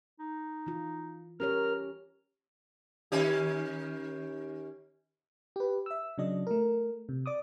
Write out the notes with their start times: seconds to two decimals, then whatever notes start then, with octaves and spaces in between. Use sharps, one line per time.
0.19 D#4
0.66 E3 F4
1.40 C#4 G4 A#4 C#5 F6
3.12 D#3 C#4 G4
5.56 G4 B4
5.86 E5 E6
6.18 C#3 F#3 D4 D#5
6.47 A3 A#4
7.09 C3
7.26 D5 D6 D#6